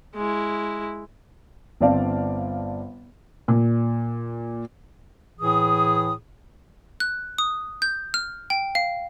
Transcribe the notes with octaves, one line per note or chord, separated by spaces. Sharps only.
G#3 E4
G1 C4 D5 F5 A5
A#2
A2 E3 G#4 D#6
F#6
D#6
G6
F6
G5
F5